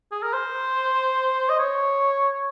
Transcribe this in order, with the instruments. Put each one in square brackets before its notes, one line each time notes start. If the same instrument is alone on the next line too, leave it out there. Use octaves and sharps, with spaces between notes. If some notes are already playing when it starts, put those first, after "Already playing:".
[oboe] G#4
A#4
C5
D#5
C#5